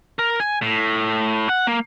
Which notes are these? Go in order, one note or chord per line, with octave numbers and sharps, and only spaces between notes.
A#4
G#5
A2
F#5
A#3